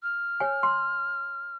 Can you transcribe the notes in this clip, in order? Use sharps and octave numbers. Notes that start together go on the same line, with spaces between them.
F6
C#5 G#5
C6